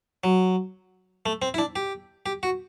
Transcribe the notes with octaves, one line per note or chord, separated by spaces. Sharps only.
F#3
A3
C4
E4
D4
G4
G4
F#4